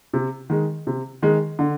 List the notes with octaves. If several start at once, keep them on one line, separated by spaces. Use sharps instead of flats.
C3
D#3 G#3
C3
D#3 G#3
D3